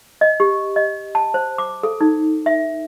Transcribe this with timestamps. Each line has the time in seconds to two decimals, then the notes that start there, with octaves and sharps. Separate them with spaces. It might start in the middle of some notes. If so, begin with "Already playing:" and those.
0.21 D#5
0.40 G4
0.76 D#5
1.15 A5
1.34 C5
1.58 D6
1.83 A4
2.01 D#4
2.46 E5